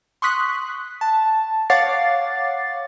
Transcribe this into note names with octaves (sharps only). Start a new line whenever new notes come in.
C6 C#6 D#6 F#6 B6
A5
C#5 F5 F#5 D6 A6 C7